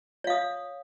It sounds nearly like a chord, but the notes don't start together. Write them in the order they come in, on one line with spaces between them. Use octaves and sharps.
C#5 F5 D#6